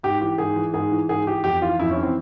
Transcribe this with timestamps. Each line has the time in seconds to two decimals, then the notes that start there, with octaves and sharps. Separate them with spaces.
0.03 G#2 G4
0.21 E3 G4
0.38 G#2 G#4
0.56 E3
0.74 G#2 G#4
0.92 E3
1.09 G#2 G#4
1.26 E3 G4
1.44 F2 G4
1.61 E3 F4
1.79 F2 E4
1.91 C#4
1.97 E3
2.03 C4